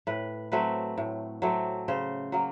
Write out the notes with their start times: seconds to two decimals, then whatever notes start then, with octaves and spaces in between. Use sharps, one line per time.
0.07 A2 B4
0.52 F#3 A3 C4 B4
0.98 A2
1.42 F#3 A3 C4
1.88 C#3 C5
2.32 F#3 A#3